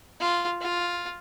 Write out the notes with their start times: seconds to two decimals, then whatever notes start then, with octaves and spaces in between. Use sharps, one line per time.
0.20 F4
0.61 F4